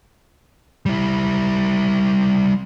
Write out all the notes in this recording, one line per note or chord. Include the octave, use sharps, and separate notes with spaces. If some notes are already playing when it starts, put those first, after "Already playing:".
G3 E4